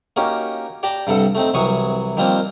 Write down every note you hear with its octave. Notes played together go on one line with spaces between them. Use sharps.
A#3 C#4 D#4 F#4 G4
G4 D5 G5 A5 A#5
G2 C3 G3 A4 F#5
A3 C4 D#4
C2 C3 E3 F#3 C#6 D#6
D#3 F3 G3 A#3 C4 F4